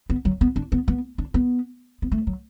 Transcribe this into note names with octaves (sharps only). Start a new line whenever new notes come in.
B3
F#3
B3
D4
B3
B3
D4
B3
B3
A3
F#3